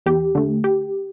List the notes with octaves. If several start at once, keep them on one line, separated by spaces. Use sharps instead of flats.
E2 G4
D3 A3
G4